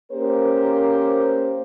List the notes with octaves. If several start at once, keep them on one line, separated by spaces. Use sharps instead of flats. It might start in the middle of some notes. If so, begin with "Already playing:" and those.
A#3 C#4 G4 A#4 C5